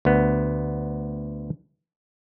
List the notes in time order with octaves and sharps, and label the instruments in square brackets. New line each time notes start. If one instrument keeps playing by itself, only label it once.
[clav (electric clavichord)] D2 B3